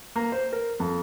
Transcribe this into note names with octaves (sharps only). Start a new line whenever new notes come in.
A#3
C5
A#4
F2